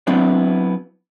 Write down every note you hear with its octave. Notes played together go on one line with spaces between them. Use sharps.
F#3 B3 C4 D4 E4